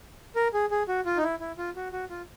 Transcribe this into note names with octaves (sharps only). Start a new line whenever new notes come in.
A#4
G#4
G#4
F#4
F4
D#4
E4
E4
F4
F#4
F#4
F4